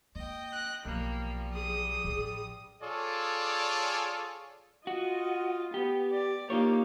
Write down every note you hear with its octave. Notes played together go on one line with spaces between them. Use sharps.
A#3 D#5 G5
F#6
B1 F3 G3 A#3
G#4 D#6
A1
F4 G#4 A4 C#5 D5
F4 F#4 D#5
B3 G4
D5
A#3 D#4 F4 G4 C#5